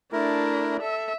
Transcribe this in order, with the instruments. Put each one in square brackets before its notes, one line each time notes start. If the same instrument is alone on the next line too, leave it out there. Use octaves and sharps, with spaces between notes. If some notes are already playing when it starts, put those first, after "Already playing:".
[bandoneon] A3 E4 A#4 [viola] D4
[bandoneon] A4 [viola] E5